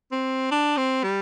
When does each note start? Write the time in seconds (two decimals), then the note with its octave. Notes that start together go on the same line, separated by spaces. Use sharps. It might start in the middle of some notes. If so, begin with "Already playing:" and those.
0.12 C4
0.51 D4
0.77 C4
1.03 G3